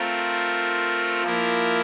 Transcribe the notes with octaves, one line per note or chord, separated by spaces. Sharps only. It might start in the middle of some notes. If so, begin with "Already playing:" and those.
Already playing: A3 C4 F4 A#4
F3 A#3 E4 A#4